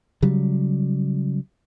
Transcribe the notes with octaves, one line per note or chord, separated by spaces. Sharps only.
C#3 F#3 G3